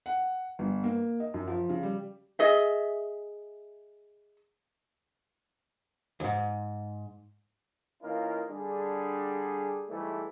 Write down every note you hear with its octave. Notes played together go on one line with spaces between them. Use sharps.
F#5
G1
A#3
D#5
F#2
F3
C#3
G3
G#4 D#5 E5
D2 G#2
E3 A#3 C#4 D#4 F4 A#4
D3 G3 D4 G#4
G#2 E3 G3 A3